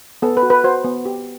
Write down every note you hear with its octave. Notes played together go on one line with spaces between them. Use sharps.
B3 A4
B4
F#4
B4
F#4 C5
B3
G4